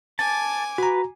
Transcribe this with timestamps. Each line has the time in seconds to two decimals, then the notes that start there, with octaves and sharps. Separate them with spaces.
0.19 G#5 A5 D6
0.78 F#4 B4 A#5